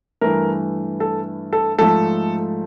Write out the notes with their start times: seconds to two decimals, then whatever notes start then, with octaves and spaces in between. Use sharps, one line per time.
0.21 G2 E3 A3 A#4
1.00 A4
1.53 A4
1.78 G#2 F3 A3 A4